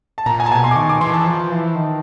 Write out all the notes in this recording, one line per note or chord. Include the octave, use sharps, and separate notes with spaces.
A5
A#2 A#5
G#5
A5
B2 G#5
C6
D6
D#3 C#6
D6
E3 C6
A5
F3
E3
D#3